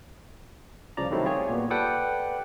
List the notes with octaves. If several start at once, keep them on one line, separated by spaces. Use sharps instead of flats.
C2 C#3 F3 D5 A#5
D#3 F#3 G3 A3 C4 E4
F4 G4 G#4 C#5
A#2 B3
G4 A4 B4 D5 F#5 G5